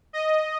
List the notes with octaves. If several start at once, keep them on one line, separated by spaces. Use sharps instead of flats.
D#5